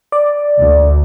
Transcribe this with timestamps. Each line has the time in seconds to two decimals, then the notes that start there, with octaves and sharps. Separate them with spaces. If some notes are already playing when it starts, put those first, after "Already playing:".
0.12 D5
0.59 D2